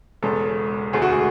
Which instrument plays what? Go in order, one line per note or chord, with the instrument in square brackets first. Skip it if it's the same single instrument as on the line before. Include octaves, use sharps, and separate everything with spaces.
[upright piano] E1 E2 C#3 G#3 A4
E1 D2 D3 A3 G#4
F#4
G#4